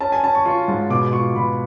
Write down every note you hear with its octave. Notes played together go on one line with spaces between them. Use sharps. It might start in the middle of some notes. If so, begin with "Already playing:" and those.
C#4 A5
G#5
C#4 A5
C#6
F4 C#6
G#2
B2 D6
F4 C#6
B2 B5